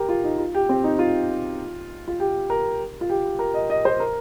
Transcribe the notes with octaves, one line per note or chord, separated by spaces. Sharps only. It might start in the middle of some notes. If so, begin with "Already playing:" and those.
Already playing: G4 A#4
F4
D#4
F4
G4
C4
D#4
F4
F4
G4
A#4
F4
G4
A#4
D#5
D#5
C5
A#4